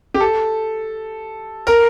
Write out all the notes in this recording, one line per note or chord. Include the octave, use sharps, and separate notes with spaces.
G4
A4
A#4